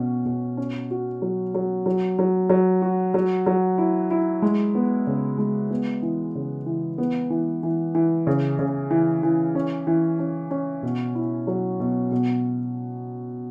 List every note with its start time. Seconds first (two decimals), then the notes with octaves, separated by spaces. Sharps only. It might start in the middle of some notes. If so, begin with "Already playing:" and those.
Already playing: B2 C#4
0.25 B2
0.57 C#4
0.91 F#4
1.22 F#3
1.55 F#3
1.86 F#3
2.19 F#3
2.50 F#3
2.82 F#4
3.14 F#3
3.46 F#3
3.78 E4
4.11 E4
4.42 G#3
4.75 B3
5.07 C#3
5.38 G#3
5.70 B3
6.02 E3
6.35 C#3
6.66 E3
6.98 B3
7.30 E3
7.63 E3
7.95 E3
8.27 C#3
8.59 C#3
8.91 E3
9.23 E3
9.55 C#4
9.87 E3
10.19 C#4
10.51 C#4
10.83 B2
11.15 E4
11.47 F#3
11.80 B2
12.11 B2